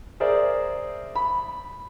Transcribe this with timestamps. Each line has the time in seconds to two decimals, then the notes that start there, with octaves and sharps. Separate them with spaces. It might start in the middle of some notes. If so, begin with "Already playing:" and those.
0.20 G#4 A#4 C5 D5 E5
1.16 B5